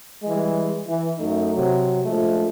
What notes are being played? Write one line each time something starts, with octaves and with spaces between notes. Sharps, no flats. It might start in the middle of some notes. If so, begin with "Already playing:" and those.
E3 G3 G#3
E3
F#2 A3 D#4
C3 F#3
A#1 F3 G#3 A3